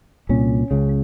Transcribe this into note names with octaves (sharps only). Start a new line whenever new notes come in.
C2 A#2 C#4
C#2 C#3